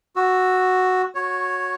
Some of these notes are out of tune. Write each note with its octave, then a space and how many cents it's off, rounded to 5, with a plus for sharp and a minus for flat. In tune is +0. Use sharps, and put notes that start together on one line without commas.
F#4 +0 E6 +0
F#4 -20 C#5 +0